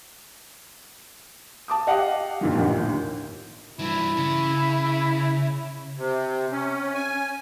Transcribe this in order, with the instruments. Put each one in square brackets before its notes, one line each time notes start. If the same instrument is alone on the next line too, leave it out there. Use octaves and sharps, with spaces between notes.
[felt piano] A5 D6 D#6
G4 D#5 F5 F#5
F2 A#2 D3 D#3 F3
A1 D#2 A#2 D3
[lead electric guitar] G2 E3 [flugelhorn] E4
[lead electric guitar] C#3
[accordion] C3
C#4
G#5